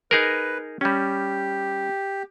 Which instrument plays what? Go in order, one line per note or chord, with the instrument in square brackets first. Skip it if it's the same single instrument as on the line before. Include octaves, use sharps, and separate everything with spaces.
[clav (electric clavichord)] D#4 G#4 A#4 [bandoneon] B4
[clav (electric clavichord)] G3 C#4 [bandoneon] G4